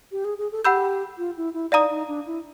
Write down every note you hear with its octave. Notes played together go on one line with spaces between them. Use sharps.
G4
G#4
G#4
A4
G4 F#5 B5 E6 G6
F4
E4
E4
D#4 D5 F5 A#5 D#6
D#4
D4
E4